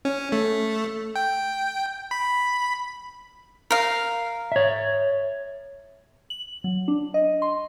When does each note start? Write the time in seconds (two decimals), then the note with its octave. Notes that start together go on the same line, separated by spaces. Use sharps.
0.05 C#4
0.32 A3
1.16 G5
2.11 B5
3.71 A#4 F5
4.52 C#5 E5
6.30 F#7
6.64 F#3
6.88 D4
7.14 D#5
7.42 C6